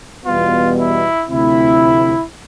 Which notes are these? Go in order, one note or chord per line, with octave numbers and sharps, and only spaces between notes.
E2 B2 G3 B3 F4
E4
D2 C3 F3 A3 C4 E4